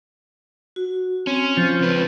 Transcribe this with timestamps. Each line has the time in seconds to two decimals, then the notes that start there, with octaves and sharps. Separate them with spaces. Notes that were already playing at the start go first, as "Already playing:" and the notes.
0.76 F#4
1.27 C4 C#4
1.57 F3
1.80 C#2 B4